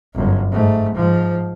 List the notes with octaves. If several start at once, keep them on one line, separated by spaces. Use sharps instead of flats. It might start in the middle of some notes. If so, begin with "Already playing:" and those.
G1 F#2
G#2 A3
G#2 F3